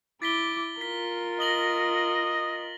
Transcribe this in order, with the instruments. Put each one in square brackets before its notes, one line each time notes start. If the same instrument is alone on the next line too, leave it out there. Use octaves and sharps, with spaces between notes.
[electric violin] E4 D6 [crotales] A6 B6 G7
[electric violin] F4 A#4 [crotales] B6
[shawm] D#5 [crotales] A#6 F#7 G7